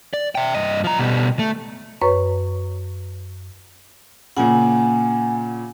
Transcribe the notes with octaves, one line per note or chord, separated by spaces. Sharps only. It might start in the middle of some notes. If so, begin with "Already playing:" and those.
D5
E5 G5
G2 D#5
F3 A#5
B2 G3
A3
F#2 B4 C#5 C#6
A#2 C#3 F#5 G#5